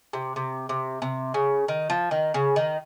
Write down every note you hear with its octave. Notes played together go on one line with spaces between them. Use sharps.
C3
C3
C3
C3
C#3
D#3
F3
D#3
C#3
D#3